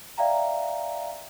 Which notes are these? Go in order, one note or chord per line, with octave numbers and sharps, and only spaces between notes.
D5 E5 F5 G5 A#5